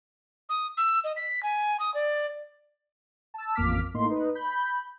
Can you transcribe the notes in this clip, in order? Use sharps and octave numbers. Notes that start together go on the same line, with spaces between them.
D#6
E6
D#5
B6
G#5
D#6
D5
A5 E6
A1 F2 A#3 D6 F6 B6
A2 A#3 D#4 C6
D#4 B4
B5 G6